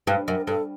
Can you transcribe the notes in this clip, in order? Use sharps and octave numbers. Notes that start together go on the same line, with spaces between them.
G2 B4
F#2 A#4
G2 A4